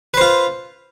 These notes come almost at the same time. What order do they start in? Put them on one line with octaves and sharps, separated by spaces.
B4 C5 F4